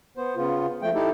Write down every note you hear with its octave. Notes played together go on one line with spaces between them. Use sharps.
B3 C5
C#3 B3 F4
F3 A3 G5
D#4 E4 G4 A4